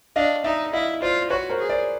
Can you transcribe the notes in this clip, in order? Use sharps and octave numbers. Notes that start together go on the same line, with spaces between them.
D4 D#5 F5
D#4 D5 E5
E4 D#5 F5
F4 C5 D5
F#4 B4 C#5
A#4 C5
G#4
C5 D5